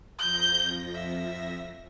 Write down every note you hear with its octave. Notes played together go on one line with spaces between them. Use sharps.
F2 F3 G6 A#6
E5